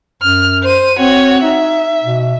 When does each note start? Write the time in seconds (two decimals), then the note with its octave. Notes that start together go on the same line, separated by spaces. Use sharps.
0.23 F#2 F6
0.63 C5 D#7
0.99 C4 F#4 C#5
1.43 D#4 E5
2.04 B2